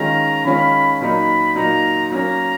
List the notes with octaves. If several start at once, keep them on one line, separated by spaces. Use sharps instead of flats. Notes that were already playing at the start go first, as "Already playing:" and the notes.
Already playing: D#3 G#3 C#4 F4 A#5
D#3 G#3 C#4 F4 B5
A#2 F#3 A#3 D#4 B5
A#2 F#3 A#3 D#4 A#5
F#3 A#3 C#4 A#5